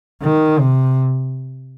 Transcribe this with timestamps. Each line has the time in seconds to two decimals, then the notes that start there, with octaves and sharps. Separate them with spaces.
0.23 D#3
0.59 C3